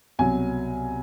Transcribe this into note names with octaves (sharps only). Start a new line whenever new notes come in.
C2 B2 F#3 G#5